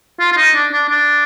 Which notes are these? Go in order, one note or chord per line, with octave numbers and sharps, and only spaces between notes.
F4
F4
D#4
D4
D4
D4